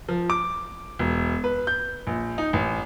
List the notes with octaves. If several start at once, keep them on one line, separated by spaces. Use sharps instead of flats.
F3
D6
E1
B4
G6
A#1
D#4
A1